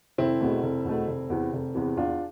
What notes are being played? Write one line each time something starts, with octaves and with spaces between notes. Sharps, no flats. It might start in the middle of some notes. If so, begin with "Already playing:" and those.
F1 C4 E4
E2 B2 A3
F1
E2 B2 A3
F1
E2 C3 E3
F1
E2 C3 E3
E2 D4 F4